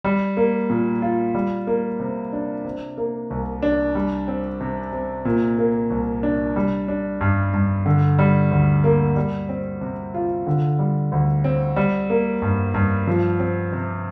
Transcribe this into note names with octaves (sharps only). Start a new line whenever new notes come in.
G3
A#3
A#2
F4
G3
A#3
C3
D4
C3
A#3
C2
D4
G3
C4
C3
C3
A#2
A#3
C2
D4
G3
D4
G2
G2
D3
G3
D2
A#3
G3
C4
C3
F4
D3
G3
D2
C4
G3
A#3
G2
G2
F3
C4
C3